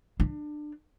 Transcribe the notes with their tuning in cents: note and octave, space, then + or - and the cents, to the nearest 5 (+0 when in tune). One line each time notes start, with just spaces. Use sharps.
D4 +25